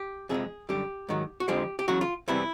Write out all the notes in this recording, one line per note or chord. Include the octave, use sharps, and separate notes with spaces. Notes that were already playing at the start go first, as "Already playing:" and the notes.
Already playing: G4
F2 C3 F3 G#3 G#4
F#2 D3 G3 G4
G#2 D#3 F#3
F#4
F2 D3 F3 G#3 G4
G4
E2 C#3 F#3 F#4
F4
E2 C3 E3 G3 E4